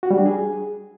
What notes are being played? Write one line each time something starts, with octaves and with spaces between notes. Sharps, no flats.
F#4
G3
D4
G#4